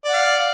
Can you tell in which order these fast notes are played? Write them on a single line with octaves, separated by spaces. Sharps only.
D5 F#5 F5